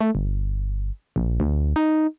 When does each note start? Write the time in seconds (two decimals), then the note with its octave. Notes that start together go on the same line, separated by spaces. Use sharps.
0.01 A3
0.15 G1
1.16 A#1
1.40 D2
1.76 D#4